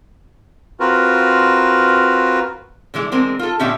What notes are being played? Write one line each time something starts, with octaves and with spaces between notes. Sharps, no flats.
C4 F4 F#4 A#4 B4
D3 E3 G#3 E4
E3 G#3 C4 A#4
F4 A4
A#2 D3 C#4 G4 E5